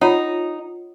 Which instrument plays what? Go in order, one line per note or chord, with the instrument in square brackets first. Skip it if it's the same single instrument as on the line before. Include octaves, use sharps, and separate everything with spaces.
[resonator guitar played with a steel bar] D#4 [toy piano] F4 C#5 F#5